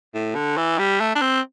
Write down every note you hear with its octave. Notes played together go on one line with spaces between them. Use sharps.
A2
D3
E3
G3
A3
D4
C4